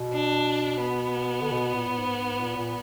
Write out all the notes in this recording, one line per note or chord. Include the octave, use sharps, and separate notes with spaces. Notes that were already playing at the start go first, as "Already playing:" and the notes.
Already playing: B2
D4
B3
D3
B2
A#2
A#2
G#2
G#2
A#2
A#2